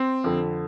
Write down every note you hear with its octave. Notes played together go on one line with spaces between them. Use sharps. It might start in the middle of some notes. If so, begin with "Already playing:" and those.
Already playing: C4
F2 D3